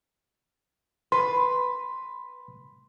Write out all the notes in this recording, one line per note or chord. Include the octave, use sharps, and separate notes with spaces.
B4 C6